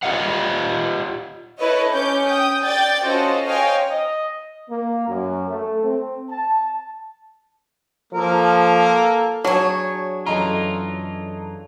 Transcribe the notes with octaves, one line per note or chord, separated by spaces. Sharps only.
F4 G4 D#5 F5 F#5
E4 A4 B4 C#5 D#5
C#4 D6 G6
G5 D#6 G6
D5 G5 G6 A6
C#4 F4 F#4 A4 C5 D#5
C5 C#5 D#5 F5 G5 G#5
D#5
A#3
F#2
A3
C4
A5
F3 A#3 A4 A#4
F#3 D4 G#4 C#5
F#2 E3 F4 A4 D#5 A#5